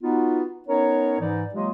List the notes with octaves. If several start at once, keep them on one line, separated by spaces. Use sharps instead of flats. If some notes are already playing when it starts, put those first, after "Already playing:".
B3 D#4 F4 F#4
B3 C#4 D#4 A#4 C#5
G#2 E3 D#4 D5
F#3 G#3 A#3 F4 G4 D#5